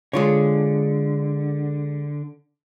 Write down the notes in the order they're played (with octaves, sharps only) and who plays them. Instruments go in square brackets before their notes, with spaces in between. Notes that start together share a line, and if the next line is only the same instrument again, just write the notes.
[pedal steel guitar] D3 [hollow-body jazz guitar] G#3 F4 C#5